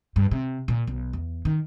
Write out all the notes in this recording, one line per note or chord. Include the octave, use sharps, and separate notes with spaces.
G2
C3
A#2
B1
E2
D#3